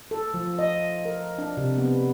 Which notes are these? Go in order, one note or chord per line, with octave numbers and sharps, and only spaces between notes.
A4
F3
D#5
A#4
D4
C3
B3